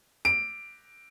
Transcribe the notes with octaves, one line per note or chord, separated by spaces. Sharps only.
D7